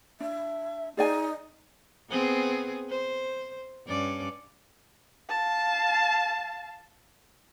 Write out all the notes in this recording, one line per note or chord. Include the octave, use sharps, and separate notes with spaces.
D4 E5
D#4 G#4 D5 G#5
B3 C4 G#4
C5
G2 C#4 D5
F5 A5